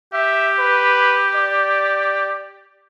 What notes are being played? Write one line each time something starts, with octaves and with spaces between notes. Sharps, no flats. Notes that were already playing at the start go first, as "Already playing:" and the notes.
G4 E5
B4
D5